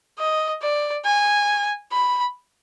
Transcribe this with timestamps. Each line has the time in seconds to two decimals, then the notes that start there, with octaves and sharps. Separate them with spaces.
0.19 D#5
0.62 D5
1.05 G#5
1.92 B5